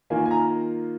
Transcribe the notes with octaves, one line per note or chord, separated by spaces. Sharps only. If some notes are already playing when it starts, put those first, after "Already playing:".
D#3 A#3 F4 G#5
G#5
A#5